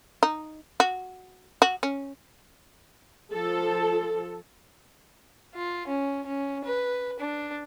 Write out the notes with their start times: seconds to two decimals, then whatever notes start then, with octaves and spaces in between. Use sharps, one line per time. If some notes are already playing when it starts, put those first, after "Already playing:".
0.23 D#4
0.80 F#4
1.62 F#4
1.83 C#4
3.32 F3 A4
5.55 F4
5.87 C#4
6.26 C#4
6.64 B4
7.19 D4